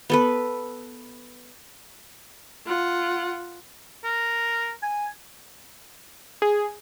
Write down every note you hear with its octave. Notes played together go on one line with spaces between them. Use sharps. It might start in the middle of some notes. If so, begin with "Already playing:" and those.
B3 A4 B4
F4 F#5
A#4
G#5
G#4